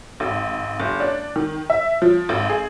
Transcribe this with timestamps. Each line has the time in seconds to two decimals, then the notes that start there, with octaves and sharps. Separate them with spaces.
0.20 G#1
0.80 F#1
1.00 D4
1.36 D#3
1.70 E5
2.02 F3
2.29 G#1
2.50 G#4